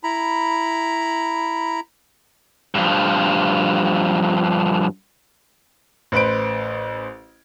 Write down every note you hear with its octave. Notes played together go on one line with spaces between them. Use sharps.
E4 A#5 B5
G2 F3
A1 B4 C5 D7